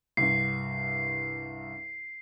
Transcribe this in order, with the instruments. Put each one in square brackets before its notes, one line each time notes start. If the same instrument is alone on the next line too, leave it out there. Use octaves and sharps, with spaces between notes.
[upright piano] C2 G2 [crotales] C7